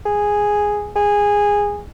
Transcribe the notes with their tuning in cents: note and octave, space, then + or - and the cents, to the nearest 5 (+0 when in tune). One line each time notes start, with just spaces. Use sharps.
G#4 -5
G#4 -15